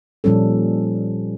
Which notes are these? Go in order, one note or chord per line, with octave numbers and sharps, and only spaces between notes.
A#2 F3 G3 C#4 A4